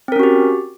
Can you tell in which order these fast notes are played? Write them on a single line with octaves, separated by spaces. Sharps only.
C4 A#4 C#4 F#4 G4